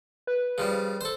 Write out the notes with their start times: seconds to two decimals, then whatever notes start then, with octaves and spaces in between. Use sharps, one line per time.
0.27 B4
0.58 C#3 F3 G3
1.01 A4 C5